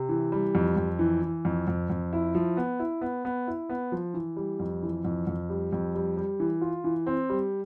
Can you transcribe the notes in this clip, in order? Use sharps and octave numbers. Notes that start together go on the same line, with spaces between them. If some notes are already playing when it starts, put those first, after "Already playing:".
Already playing: C3
E3
G3
F2
F2
E3
E3
F2
F2
F2
E4
F3
B3
E4
B3
B3
E4
B3
F3
E3
G3
F2
E3
F2
F2
G3
F2
G3
G3
E3
F4
E3
C4
G3